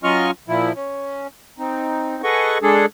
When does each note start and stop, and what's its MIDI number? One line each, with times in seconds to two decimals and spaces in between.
0.04 0.31 54
0.04 0.31 61
0.04 0.31 65
0.04 0.31 75
0.04 0.31 85
0.04 0.31 89
0.48 0.72 46
0.48 0.72 53
0.48 0.72 64
0.76 1.27 61
1.58 2.22 60
1.58 2.22 63
2.23 2.58 68
2.23 2.58 69
2.23 2.58 71
2.23 2.58 75
2.23 2.58 78
2.23 2.58 85
2.62 2.86 56
2.62 2.86 62
2.62 2.86 68
2.62 2.86 69